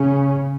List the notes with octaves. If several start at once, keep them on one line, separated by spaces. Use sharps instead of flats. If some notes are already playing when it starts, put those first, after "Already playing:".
Already playing: C#3 C#4